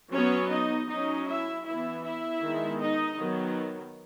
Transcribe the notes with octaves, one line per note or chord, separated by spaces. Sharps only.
F#3 B3 C#4 C#5
D#4 D#5
F#3 C#4 D#4 D#5
E4 E5
E3 E4 E5
B3
E4 E5
D#3 G#3 B3
D#4 D#5
D#3 F#3 B3